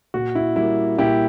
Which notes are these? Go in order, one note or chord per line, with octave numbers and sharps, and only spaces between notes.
A#2 F#4
E4
G3 A#3 E4
A#2 E4 G4